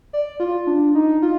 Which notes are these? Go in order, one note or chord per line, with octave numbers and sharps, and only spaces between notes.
D5
F4
D4
D#4
F4